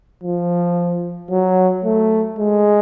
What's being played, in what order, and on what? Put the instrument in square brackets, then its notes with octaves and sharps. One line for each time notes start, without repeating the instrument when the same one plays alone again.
[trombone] F3
F#3
A3
G#3